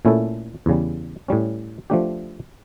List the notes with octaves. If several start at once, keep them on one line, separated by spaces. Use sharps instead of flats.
A#2 A3 C#4 E4 A4
E2 C#3 G3
A2 G3 C#4
F3 A3 D4 G4